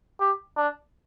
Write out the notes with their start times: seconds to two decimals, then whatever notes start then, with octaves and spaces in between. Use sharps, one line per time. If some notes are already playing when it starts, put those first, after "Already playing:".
0.20 G4
0.57 D4